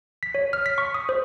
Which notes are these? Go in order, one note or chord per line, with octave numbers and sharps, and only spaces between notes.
B6
C#5
F6
B6
C#6
D#6
C5